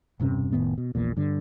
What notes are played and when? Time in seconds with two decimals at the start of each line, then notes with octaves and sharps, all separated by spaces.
0.20 E1 G2 C3 C#4
0.52 F1 A2 D#3 B3
0.78 B2
0.95 A#1 E2 A#2
1.17 G2 D3